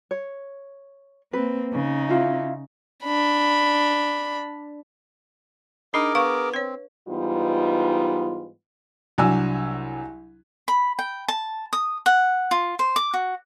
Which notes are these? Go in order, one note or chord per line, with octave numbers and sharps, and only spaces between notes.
C#5
A#3 C4 B4
C#3 D#4
E4 F4
D4 B5
D4 D#4 G#4 A#4 D6
B3 F5 C#6
C4 B4 C#5
G#2 E3 G3 B3 D#4 F4
C2 F#3 D4 G#5 E6
B5
G5
A5
D#6
F#5
F4
C5
D6
F#4